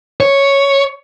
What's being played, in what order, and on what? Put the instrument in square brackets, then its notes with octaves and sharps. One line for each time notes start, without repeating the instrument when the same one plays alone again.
[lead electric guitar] C#5